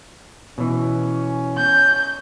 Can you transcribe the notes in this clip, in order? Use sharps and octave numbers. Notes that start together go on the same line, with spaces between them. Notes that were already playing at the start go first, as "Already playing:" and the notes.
B2 E3 C#4
G6